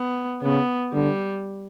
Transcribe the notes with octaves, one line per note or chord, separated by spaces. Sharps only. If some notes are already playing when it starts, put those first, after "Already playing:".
Already playing: B3
C#3 B3
D3 G3